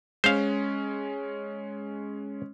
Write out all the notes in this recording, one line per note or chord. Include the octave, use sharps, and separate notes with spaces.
G#3 C#4 C5 F5